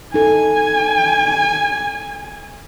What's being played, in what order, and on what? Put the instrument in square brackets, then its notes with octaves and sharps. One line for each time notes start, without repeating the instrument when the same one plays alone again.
[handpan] D#4 A4 [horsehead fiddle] G#5